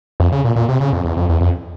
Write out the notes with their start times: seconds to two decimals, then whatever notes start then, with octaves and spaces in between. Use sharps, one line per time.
0.20 F2
0.32 C#3
0.45 A#2
0.56 A#2
0.69 C3
0.81 C#3
0.93 F2
1.05 E2
1.17 F2
1.29 E2
1.41 F2